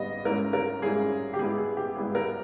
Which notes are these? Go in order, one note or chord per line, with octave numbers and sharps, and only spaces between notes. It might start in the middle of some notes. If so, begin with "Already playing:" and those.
Already playing: G#2 G3 B3 D#5
G#2 G3 C#4 E4 A#4
A#4
G#2 G3 C#4 E4 G#4
G4
G#2 G3 B3 E4 G#4
G#4
G4
G#2 G3 B3 E4 G#4
A#4